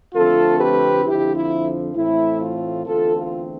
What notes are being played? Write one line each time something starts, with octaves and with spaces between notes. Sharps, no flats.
F2 D3 A3 C4 F4 A4
G4 B4
F2 D3 F3 E4 G4
E4
A2 E3 A3 C4 E4
F4
E2 D3 A3 C4 F4 A4
F4